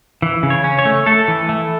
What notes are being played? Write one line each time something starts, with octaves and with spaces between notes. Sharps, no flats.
E3
C#3
C#5
C#4
C#5
A3
A3 A4
E3
A3